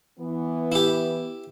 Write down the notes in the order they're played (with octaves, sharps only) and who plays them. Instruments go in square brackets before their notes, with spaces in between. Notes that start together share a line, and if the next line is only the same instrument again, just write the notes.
[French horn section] E3 B3
[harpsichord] E4 G4